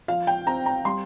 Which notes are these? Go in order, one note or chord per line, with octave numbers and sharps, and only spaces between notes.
F3 F5
G5
C4 A#5
A#5
G3 C6